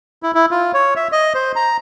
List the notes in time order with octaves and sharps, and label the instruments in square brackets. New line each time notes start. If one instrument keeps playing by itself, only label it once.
[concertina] E4
E4
F4
C#5
E5
D#5
C5
A#5